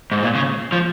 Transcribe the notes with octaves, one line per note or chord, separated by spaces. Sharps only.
G#2
A#2
C#3
F3